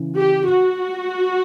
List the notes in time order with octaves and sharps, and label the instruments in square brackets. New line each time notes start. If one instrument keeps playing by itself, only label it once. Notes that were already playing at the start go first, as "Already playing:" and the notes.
Already playing: [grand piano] C#3 E3
[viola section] G4
F#4